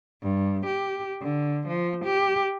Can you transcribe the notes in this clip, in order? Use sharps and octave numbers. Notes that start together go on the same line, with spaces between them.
G2
G4
D3
F3
G4